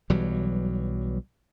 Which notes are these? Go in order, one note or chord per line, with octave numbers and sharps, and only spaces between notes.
B1 E3 F#3 G3